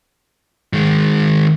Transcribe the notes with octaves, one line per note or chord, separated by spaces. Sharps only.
D#3 G#3